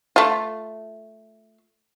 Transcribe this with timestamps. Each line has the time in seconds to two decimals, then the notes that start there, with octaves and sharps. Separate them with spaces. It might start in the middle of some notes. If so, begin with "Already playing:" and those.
0.16 A3 F4